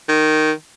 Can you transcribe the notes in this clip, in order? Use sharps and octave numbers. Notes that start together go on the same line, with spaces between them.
D#3